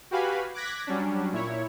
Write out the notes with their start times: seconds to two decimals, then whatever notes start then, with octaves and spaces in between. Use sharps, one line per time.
0.11 F#4 G4 B4 F5 G#5 B5
0.54 D6 F#6 G#6 A#6 B6
0.87 F#3 G3 C#4 D4
1.32 A#2 E4 C#5